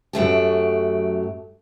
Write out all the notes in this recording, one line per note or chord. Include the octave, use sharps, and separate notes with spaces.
F#2 F#3 A3 G4